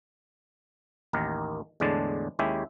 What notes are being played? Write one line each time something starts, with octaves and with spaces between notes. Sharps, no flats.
A1 D#2 D#3 A#4
E2 A2 D3 G#3 D4 A5
D#2 G#3 C#4 E4 G4 E5